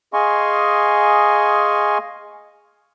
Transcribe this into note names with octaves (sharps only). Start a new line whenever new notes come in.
G#4 D#5 F5 G#5 C6 C#6